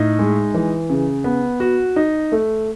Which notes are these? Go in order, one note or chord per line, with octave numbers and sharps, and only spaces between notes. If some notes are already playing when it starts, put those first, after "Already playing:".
Already playing: A2 D#4
G#3
E3
C#3
B3
F#4
D#4
A3